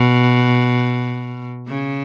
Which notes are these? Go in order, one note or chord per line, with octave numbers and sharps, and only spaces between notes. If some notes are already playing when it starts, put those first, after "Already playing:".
Already playing: B2
C#3